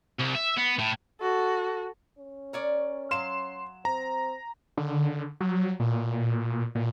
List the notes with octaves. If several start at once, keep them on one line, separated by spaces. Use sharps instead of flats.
C2
E5
B3
A2
F#4 A4
C#4
A#4 C#5 D5
F#3 F5 C6 E7
C4 A#5
D3
F#3
A#2
A#2